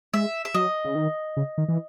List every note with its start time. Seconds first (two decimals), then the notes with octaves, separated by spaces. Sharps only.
0.14 G#3 E5
0.45 E5
0.54 F#3 D#5
0.85 C#3
0.95 D#3
1.37 C#3
1.58 D#3
1.68 E3